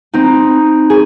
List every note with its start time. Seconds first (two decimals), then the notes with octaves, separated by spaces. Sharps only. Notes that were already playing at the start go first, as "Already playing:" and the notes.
0.14 C4 D#4
0.90 G#4